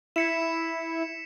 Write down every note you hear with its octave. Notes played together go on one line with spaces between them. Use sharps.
E4 B6 C#7 E7